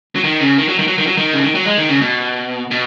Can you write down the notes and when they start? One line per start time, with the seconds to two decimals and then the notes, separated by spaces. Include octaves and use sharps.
0.15 F#3
0.24 D#3
0.41 C#3
0.58 D#3
0.68 F#3
0.79 D#3
0.87 F#3
0.98 D#3
1.07 F#3
1.17 D#3
1.33 C#3
1.44 D#3
1.55 F#3
1.66 G#3
1.77 D#3
1.89 C#3
2.01 B2
2.71 B2